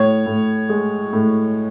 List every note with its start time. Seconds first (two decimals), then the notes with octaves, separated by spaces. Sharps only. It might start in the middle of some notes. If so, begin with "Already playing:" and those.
Already playing: A2 C#5
0.26 A2
0.69 G#3
1.13 A2